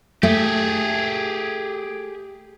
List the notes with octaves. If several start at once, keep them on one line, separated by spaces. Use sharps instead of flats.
A3 G4 G#4